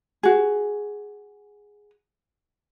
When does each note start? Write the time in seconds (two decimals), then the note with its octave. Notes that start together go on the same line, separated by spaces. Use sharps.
0.23 F#4 G#4